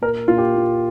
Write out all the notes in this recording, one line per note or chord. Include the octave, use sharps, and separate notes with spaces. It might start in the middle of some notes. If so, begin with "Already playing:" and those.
A#2 A#4
A#2 F4
G4
A#2